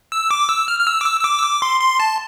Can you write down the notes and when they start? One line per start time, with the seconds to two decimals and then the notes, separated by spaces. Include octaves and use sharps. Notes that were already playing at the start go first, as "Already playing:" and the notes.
0.12 E6
0.31 D6
0.49 E6
0.68 F6
0.79 F6
0.87 E6
1.01 D6
1.06 E6
1.21 E6
1.24 D6
1.38 E6
1.43 D6
1.62 C6
1.81 C6
2.00 A5